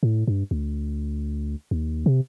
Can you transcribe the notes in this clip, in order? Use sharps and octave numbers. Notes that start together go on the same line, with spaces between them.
A2
G2
D2
D#2
C3